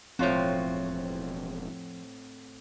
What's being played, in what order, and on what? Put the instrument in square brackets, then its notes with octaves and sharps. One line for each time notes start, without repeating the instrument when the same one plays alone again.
[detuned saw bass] E1 [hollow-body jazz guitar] F2 F4 C#5 [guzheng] A2 F#4 [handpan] C4